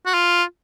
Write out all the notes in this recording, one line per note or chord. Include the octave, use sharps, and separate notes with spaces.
F#4
F4